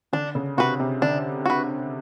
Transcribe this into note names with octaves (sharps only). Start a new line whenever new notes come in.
D3 D4
C#3
C3 F#4 B4
C3
D3 D4
F#4 B4